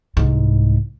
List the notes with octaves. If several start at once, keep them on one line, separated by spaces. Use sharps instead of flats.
C2 G#2